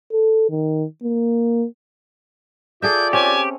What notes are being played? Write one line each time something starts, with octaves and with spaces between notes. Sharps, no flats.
A4
D#3
A#3
F4 G#4 A4 D5 E5 G6
C4 C#4 G4 G#5